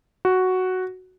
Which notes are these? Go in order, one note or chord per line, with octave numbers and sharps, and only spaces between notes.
F#4